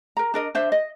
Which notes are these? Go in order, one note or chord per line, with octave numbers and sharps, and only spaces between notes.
A#4 A#5
D4 A#4 D#5
D4 C5 E5
D#5